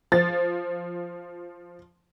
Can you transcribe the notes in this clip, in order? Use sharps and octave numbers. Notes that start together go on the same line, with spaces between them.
F3 A6